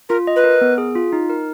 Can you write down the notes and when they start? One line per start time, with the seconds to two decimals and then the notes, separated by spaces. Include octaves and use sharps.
0.09 F4 A#4
0.27 D#5
0.36 B4
0.44 A#4
0.61 B3
0.78 G#4
0.95 F4
1.13 D#4
1.30 A#4